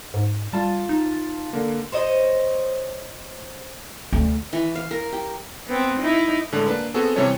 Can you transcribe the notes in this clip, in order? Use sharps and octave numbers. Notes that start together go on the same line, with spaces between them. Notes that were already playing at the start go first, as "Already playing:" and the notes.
G#2
G3 F4 A5
D#4
D3 A#3
C5 C#5 D#5
D2
E3
F5
A#4
G4
B3 C4
D#4 E4
A2 D3 G#3 A5
A#3 D4 B4
B3 C4 F#4 G#4 A4
C3 E3 G3 C#4 C#5 A5